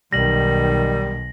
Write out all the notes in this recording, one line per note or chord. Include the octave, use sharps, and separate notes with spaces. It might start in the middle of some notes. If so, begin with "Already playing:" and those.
B1 D#3 G3 A#6 F#7